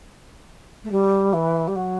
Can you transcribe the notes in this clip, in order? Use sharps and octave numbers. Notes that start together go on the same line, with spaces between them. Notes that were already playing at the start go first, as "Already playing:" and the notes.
A3
G3
E3
G3
F#3